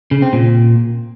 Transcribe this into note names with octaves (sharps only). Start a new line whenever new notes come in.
C#3
C4
A#2